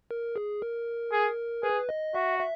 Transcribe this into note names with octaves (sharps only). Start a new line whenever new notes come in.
A#4
G#4
A#4
G#4
G#4 B4
D#5
F#4 E5
E5